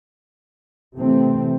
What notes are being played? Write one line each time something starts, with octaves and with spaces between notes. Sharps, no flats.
C3 E3 A3 C4